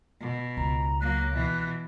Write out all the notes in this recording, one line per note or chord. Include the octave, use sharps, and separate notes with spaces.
B2
C#2 A#5
F#3 A#3 F#6
B2 E3